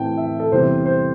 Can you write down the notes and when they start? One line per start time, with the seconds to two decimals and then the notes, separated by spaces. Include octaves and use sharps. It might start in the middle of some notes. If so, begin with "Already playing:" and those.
Already playing: A2 E3 A3 C4 G5 A5
0.17 E5
0.40 A4
0.52 E2 C3 G3 C4 C5
0.86 C5